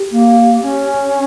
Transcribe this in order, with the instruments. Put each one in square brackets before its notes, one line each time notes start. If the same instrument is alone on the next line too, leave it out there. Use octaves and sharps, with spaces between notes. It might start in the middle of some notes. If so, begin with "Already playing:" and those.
Already playing: [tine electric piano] G4
[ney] A#3
C#4